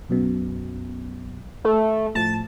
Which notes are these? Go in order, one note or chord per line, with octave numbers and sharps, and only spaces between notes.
B1 F#2 B2
A3
A2 F3 A5